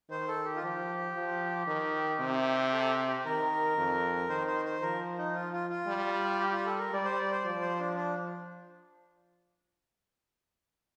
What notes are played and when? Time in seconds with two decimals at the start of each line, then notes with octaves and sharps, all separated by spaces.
0.10 D#3 C5
0.28 A4
0.45 G4
0.56 F4
0.62 F3 G4
1.15 F3
1.67 D#3
2.20 C3
2.73 A4
2.89 G4
3.07 G4
3.25 D#3 A#4
3.77 F2
4.29 D#3 C5
4.47 C5
4.65 C5
4.82 F3 A#4
5.18 D#4
5.34 F4
5.53 F4
5.69 F4
5.87 G3
6.39 G4
6.52 F4
6.66 A4
6.79 A#4
6.92 G3 D5
7.05 C5
7.18 D5
7.31 C5
7.44 F3 D5
7.61 C5
7.80 D4
7.96 D4